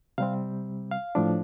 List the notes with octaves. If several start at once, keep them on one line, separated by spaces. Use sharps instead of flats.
C3 G3 C4 F5
F5
A2 F3 D4